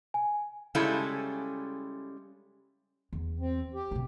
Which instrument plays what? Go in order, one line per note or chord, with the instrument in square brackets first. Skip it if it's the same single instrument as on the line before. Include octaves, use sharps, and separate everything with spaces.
[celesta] G#5
[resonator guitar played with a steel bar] C#3 G3 G#3 C#4 E4 A4
[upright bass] E2
[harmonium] C4
G4
[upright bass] B2 C4